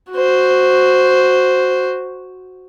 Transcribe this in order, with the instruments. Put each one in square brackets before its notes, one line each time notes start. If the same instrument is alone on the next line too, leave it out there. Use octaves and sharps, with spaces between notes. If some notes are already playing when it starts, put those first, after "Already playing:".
[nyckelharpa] F#4 C5